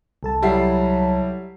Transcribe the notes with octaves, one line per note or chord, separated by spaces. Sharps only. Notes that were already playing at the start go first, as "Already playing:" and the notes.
C2 A4 A5
F#3 G3 E4 G4 E5 F#5 C7